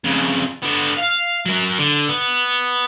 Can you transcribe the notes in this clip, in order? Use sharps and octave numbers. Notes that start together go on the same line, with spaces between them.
F2 C#3
D3 B3
F5
F#3 A#4
D3
B3